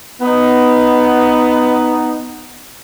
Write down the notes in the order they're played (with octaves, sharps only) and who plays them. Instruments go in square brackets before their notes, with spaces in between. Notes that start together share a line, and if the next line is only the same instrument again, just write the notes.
[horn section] B3 D#4